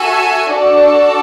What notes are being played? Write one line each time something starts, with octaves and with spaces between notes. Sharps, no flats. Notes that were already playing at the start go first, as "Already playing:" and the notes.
Already playing: F#4 A4 E5 G#5
D4 F#4 A4 D5 A5